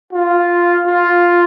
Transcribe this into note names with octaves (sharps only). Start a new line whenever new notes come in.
F4
F4